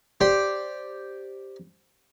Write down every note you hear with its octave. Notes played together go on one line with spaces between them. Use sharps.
G4 C5 D5 G5